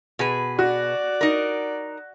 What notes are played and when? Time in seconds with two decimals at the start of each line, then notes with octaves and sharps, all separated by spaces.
0.19 B2 G#4 B4
0.59 F#4 D5
1.21 D#4 A#4